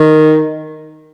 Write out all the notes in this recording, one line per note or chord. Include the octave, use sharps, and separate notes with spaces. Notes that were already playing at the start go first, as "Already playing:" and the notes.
Already playing: D#3